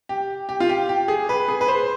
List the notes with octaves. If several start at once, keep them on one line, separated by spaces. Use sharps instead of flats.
G4
G4
F4
G4
G4
G#4
B4
G#4
B4
C5